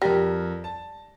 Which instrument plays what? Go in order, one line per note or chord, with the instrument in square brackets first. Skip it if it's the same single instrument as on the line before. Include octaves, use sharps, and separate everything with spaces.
[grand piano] F2 A#4 A#6 [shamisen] G3
[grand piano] A5